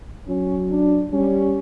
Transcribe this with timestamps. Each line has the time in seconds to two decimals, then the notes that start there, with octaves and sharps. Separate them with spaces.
0.28 F#3 C#4
0.70 D4
1.12 G3 C#4